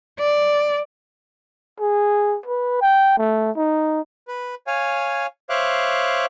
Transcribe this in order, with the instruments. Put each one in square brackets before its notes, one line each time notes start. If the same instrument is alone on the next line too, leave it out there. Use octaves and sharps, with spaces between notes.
[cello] D5
[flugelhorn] G#4
B4
G5
A3
D#4
[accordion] B4
C#5 F5 G#5
C5 C#5 E5 F5 D6 F#6